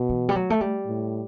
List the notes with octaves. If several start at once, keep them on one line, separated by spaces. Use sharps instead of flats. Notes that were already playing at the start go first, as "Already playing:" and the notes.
Already playing: B2
E3
G3
F#3
A3
G3
A2